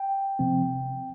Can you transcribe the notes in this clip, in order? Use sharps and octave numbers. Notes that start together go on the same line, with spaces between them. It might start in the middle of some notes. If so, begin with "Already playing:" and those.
Already playing: G5
C3 F3 C4